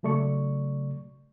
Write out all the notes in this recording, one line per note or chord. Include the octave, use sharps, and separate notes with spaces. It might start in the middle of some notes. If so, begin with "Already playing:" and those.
C#3 F#3 A3 D5 C#6